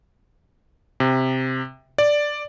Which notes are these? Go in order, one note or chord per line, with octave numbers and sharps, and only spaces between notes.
C3
D5